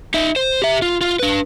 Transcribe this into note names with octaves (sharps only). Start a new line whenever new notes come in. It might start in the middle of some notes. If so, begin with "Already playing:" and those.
D#4 E5
C5
G4 E5
F4
F4
D4 B4